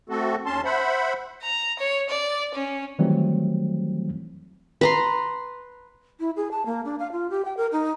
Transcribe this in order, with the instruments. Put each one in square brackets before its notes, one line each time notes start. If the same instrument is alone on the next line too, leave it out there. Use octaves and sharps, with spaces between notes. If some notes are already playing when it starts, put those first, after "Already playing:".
[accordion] A3 C4 F#4 A4
D#2 C#4 A5 C6
C5 E5 F#5 B5
[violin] A#5
C#5
D5
C#4
[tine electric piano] D#3 E3 F#3 G3 A3 C4
[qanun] B4 A#5 C6
[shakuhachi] E4
G#4
A5
A#3
D4
F5
F4
G4
G5
A#4
D#4